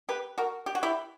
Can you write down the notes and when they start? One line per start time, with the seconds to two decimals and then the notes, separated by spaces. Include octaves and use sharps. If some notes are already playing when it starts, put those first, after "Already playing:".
0.09 G4 B4
0.38 F#4 A#4
0.66 G4
0.75 F#4
0.83 E4 G4